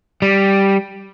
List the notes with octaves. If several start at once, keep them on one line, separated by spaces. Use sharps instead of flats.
G3